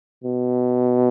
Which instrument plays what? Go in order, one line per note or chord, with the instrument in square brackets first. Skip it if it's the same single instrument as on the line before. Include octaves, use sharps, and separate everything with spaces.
[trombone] B2